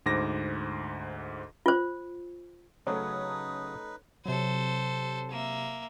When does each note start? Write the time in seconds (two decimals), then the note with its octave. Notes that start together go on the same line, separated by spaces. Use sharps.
0.06 D2 G#2 C5 D6 A#6
1.66 F4 C5
2.87 C#3 F#3 A3 C#4 D#4 B4 D#6
4.26 C3 F#3 A4 C5
5.31 A#3 E5